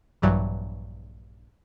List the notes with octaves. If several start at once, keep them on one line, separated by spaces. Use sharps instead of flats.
A#1 G2 E3 F#3 G3